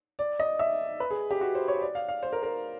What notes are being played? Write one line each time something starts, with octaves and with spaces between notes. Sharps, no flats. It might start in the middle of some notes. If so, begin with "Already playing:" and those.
D5
D#5
E5
B4
G#4
G4
F#4
C5
C#5
D5
F5
F5
C5
A#4
A#4